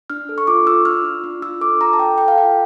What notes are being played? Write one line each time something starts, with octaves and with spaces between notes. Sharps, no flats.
D4 F6
A4
C#6
F4 D6
F4 E6
D4 F6
F4
D4
F4 E6
A4 D6
F4 A#5
A5
A4 G5
A4 G5
F5
F4 G5